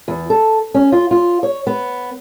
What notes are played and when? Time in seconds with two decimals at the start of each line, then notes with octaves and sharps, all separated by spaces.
0.08 E2
0.30 A4
0.74 C#4
0.92 F4
1.11 F4
1.43 C#5
1.67 B3